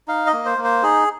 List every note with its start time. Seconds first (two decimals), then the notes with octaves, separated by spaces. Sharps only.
0.08 D#4 F5
0.27 D#5
0.33 A#3
0.46 C5
0.58 A#3
0.64 C5
0.83 D#4 G#4